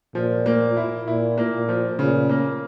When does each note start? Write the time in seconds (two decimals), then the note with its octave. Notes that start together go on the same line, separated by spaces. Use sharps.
0.15 A#2 F3
0.46 A#3
0.77 E4
1.07 A#2 E4
1.38 A#3
1.53 A#2
1.69 F3
1.99 A#2 C#3
2.29 A#3